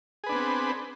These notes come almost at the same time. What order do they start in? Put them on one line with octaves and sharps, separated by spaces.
G#4 B4 D4 B3 C4